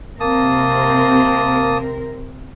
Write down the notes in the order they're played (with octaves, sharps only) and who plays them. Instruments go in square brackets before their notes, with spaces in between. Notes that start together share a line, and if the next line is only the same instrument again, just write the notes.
[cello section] C3 C4 A#4 [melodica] A#3 A5 D#6